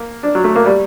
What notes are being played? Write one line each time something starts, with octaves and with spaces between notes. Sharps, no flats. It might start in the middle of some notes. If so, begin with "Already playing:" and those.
Already playing: A#3
D4
F#3
A3
A#3
G3